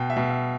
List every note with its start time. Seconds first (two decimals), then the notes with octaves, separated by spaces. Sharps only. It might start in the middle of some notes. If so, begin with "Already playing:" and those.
Already playing: B2 G5
0.10 E5
0.17 B2
0.30 E5